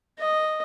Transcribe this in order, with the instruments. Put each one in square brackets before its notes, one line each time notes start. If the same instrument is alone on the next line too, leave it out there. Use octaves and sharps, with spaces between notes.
[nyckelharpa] D#5